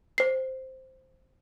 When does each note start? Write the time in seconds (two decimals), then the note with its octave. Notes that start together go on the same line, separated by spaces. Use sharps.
0.18 C5 C7